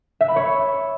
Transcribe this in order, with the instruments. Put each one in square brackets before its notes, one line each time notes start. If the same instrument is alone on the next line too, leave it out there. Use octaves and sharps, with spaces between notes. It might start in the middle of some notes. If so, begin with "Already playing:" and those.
[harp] E5
B5
C#5